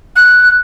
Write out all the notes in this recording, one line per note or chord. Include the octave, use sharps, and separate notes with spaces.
F#6